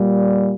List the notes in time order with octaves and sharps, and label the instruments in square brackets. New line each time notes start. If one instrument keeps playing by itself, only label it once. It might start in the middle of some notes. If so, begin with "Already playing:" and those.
Already playing: [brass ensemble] A#2 G3